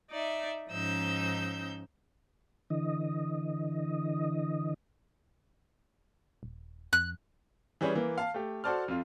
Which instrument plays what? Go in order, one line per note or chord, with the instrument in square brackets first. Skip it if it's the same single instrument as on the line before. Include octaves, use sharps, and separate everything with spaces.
[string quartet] D#4 D5 E5
G#2 F3 C#4 D#4 E6 G6
[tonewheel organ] D3 E3 D#5
[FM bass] D#1
[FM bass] F2 [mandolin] F#6
[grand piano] E3 G3 C#4 G#4 B4
E3 A#3
F5 A5
A3 G4
F#4 A4 C5 D5 A5 F6
F2 F4